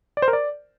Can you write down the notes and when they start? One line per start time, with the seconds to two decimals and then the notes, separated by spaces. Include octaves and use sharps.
0.17 D5
0.22 C5
0.28 A#4
0.33 D5